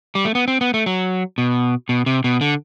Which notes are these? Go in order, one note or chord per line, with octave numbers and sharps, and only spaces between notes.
G3
A3
B3
C4
B3
A3
F#3
B2
B2
C3
B2
D3